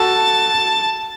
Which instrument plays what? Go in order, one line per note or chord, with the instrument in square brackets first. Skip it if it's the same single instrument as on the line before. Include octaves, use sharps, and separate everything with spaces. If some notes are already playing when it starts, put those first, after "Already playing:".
Already playing: [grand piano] F#4 A4 [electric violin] A5